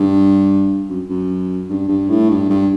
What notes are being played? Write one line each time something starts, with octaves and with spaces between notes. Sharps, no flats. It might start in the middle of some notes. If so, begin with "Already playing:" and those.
Already playing: G2
F#2
F#2
G2
G2
A2
G2
G2